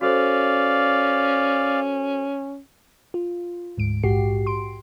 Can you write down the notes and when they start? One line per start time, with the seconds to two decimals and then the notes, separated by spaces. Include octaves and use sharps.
0.01 C#4 F#4 A4 C5 D5 F5
3.14 F4
3.77 D2 G#2 D7
4.03 A#1 G#2 F#4 G4 C7
4.46 C6 D7